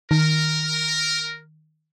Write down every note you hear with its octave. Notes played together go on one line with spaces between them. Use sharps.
D#3 A#4